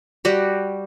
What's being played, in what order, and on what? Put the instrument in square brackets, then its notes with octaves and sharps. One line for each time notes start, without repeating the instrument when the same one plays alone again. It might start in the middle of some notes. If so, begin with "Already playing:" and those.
[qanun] G3 F#4 G4